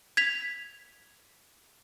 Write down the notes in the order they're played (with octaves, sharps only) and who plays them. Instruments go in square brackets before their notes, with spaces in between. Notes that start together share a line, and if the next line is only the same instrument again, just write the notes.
[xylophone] G#6 B6 F7